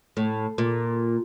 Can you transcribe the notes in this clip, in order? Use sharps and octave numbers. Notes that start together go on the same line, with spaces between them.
A2
A#2